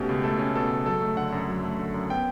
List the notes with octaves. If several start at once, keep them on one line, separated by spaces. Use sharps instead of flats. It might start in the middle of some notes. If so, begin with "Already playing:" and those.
Already playing: B2 A3 C#4 G4
C#2
A3 A4
C#4
B2 A4
C#2
F#3 A4
A3
D3 F#5
F#2
F#3
A3
D3
F#2
B3 G5